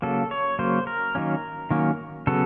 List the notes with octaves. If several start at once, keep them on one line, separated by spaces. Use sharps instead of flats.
C#3 F#3 A#3 A4
C#5
C#3 F#3 A#3 C5
A#4
D#3 F#3 A#3 C#4
D#3 F#3 A#3 C#4
C#3 F#3 B3 A4